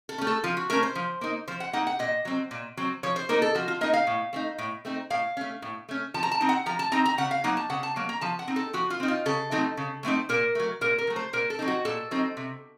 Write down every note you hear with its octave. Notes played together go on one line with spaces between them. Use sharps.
A4
A3 C#4
A4
F3 F4
F#4
A3 C#4 A#4
C5
F3
A#3 D#4
F3 C5
F#5
A#3 D#4 F#5
F#5
A#2 D#5
F#3 C4
A#2
F#3 C4
F3 C#5
C5
A#3 D#4 A#4
A4
F3 F#4
F4
A#3 D#4 D#5
F5
A2
A3 C4 D#4
A2
A3 C4 D#4
A2 F5
A3 C#4
A2
A3 C#4
F3 A5
A#5
A5
C4 D#4
F#5
F3 A#5
A5
C4 D#4 A#5
A#5
C#3 F#5
F5
F#3 A#3 D#4 F#5
A5
C#3 F#5
A5
F#3 A#3
A#5
F3 A5
F#5
C4 D#4
A4
F3 F#4
F4
C4 D#4
F4
C#3 A4
F#3 A3 C4 D#4
C#3
F#3 A3 C4 D#4
A#2 A#4
F#3 A3
A#2 A#4
A#4
F#3 A3
C5
A#2 A#4
A4
F#3 C4 D#4
F#4
A#2 A4
F#3 C4 D#4
C3